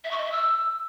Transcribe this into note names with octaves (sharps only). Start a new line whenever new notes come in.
E5
C#6
D#5
E5
E6